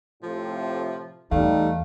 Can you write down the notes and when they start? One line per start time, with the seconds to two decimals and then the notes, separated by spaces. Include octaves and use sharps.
0.23 A2 C3 F3 F4
1.31 E2 G3 A3 D#4 F5